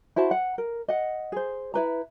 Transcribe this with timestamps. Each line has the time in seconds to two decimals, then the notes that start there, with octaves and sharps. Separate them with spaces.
0.16 E4 F#4 C5 A5
0.31 F#5
0.58 A#4
0.88 D#5 F#5
1.32 G#4 C5
1.74 E4 B4 A#5